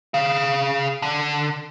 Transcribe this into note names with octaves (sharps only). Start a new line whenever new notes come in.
G#4 F5
D3